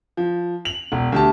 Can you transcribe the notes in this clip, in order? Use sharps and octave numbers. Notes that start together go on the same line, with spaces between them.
F3
F7 F#7
E1
D2 G4 A5